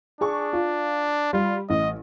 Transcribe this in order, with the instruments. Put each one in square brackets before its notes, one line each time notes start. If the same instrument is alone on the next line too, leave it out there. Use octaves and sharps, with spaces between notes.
[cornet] D4 [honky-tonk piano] G#4 C#6
[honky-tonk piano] F4
[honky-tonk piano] G3 [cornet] F4
[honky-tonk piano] A1 [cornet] D#5